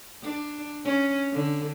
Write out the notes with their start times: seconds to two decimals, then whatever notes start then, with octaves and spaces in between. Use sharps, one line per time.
0.22 D4
0.85 C#4
1.33 D3